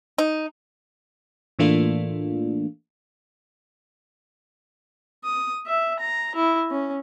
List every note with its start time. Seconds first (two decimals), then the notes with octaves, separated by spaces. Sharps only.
0.18 D#4
1.59 A2 E3 A3 A#3 D4 F4
5.24 D#6
5.67 E5
6.00 A#5
6.35 E4
6.71 C#4